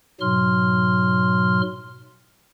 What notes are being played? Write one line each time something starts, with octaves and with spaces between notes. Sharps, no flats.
G#2 B2 F#3 C6 F6